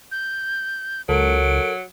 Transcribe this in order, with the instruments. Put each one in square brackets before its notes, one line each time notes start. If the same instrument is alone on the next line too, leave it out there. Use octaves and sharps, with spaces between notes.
[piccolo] G6
[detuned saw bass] C#2 [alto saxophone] F#3 [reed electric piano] A4 A#4 [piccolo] D7